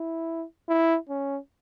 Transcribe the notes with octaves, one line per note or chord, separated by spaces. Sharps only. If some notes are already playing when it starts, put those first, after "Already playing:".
Already playing: E4
E4
C#4